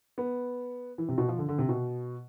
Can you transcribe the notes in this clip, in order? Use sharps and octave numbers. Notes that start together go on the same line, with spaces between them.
B3
E3
C3
B2
F3
D3
D3
C3
B2